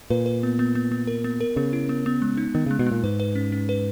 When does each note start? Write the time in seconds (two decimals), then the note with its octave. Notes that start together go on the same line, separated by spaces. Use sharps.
0.10 A#2 B4
0.26 B4
0.43 B3
0.59 B3
0.75 B3
0.92 B3
1.07 A#4
1.24 B3
1.40 A#4
1.56 C#3 B3
1.73 E4
1.89 B3
2.06 B3
2.22 G#3
2.37 D#4
2.55 D#3 B3
2.66 C#3 G#3
2.79 B2
2.87 G#3
2.92 A#2
3.04 G#2 B4
3.20 B4
3.35 C#4
3.52 C#4
3.69 B4